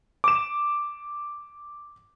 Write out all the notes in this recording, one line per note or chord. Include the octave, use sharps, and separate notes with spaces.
D6 E7